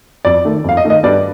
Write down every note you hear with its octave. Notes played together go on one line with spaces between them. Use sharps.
F2 D5
D#3 A3
F2 F5
D#5
D#3 A3
D#5
G2 D5